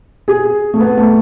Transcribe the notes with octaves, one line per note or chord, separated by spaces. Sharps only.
G#4
A3
B3
A3